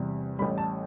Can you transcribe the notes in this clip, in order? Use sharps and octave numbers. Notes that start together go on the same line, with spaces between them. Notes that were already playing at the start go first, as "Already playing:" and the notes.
Already playing: E2 C3 G3
A1 A2 G3 B5
A5